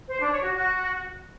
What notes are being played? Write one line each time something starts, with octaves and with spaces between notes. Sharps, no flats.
C5
D4
C#5
F#4
F#4